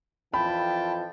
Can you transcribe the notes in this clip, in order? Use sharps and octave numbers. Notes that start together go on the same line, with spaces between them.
F2 E3 F4 G5 A5 B5